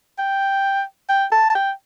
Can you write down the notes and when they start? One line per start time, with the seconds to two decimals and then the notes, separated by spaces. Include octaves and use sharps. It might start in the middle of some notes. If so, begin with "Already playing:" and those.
0.18 G5
1.09 G5
1.32 A5
1.50 A5
1.55 G5